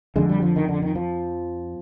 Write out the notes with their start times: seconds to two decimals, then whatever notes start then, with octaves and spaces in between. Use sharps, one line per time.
0.16 F2 D3 G#3
0.29 G3
0.42 F3
0.56 D#3
0.68 D3
0.82 D#3
0.95 F3